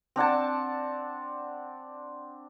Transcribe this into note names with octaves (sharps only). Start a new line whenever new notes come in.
C4 D4 F#5 A5